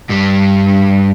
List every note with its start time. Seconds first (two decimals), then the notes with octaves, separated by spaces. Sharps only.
0.09 G2 G3